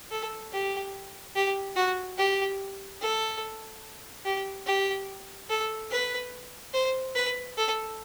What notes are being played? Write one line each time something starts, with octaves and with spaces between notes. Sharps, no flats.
A4
G4
G4
F#4
G4
A4
G4
G4
A4
B4
C5
B4
A4